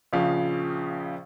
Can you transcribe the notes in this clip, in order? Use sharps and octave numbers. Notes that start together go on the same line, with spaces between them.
A#1 C#3 F3 F5